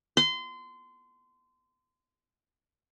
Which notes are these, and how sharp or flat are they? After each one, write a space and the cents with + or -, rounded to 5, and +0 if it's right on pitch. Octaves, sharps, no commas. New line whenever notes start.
C6 -25